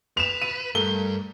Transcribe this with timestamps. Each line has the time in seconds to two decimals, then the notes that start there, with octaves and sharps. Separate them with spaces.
0.17 B4 E7 F7
0.42 D#7
0.75 G2 A3 A4 A#4 G7